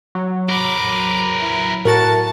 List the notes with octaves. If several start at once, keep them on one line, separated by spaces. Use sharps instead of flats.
F#3
A#4 B4 D6
E4
A2 F#4 A#4 A5 A6